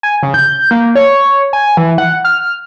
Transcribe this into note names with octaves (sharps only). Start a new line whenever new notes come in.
G#5
C#3
G6
A#3
C#5
G#5
E3
F#5
F6